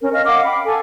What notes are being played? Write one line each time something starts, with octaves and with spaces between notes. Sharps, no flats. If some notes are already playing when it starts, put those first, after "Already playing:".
C#4 A#4
D#5 F5 F6
F5 F#5 D6
G5 B5
A4 G#5